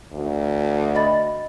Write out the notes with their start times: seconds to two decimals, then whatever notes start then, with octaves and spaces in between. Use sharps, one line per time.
0.12 D2
0.95 D#5 B5 A6